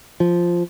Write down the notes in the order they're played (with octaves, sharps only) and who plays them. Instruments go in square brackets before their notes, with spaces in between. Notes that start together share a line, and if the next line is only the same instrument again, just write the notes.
[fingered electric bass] F3